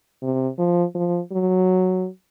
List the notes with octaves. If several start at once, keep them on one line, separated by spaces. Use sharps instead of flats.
C3
F3
F3
F#3